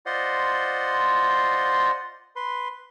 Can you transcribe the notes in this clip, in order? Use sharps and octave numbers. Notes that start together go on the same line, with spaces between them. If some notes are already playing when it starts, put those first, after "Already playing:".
F4 C5 D5 D#5 F#5 C6
B4 C6